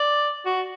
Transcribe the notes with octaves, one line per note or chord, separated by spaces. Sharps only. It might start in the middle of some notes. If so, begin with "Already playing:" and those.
Already playing: D5
F#4